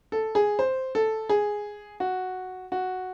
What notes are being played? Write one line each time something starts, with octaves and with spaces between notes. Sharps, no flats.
A4
G#4
C5
A4
G#4
F#4
F#4